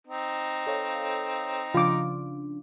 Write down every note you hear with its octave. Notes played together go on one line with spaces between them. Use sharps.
C4 D#4
A4 C#5 F5
C#3 F3 D4 F4 D6